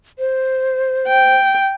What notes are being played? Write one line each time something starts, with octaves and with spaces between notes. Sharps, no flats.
C5
G5